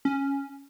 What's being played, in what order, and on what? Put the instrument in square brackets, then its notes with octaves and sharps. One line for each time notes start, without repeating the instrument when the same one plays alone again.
[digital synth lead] C#4